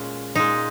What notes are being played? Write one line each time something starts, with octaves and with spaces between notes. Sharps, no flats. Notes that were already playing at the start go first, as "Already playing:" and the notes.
Already playing: A#2 G#3 C#4
A#2 G#3 D#4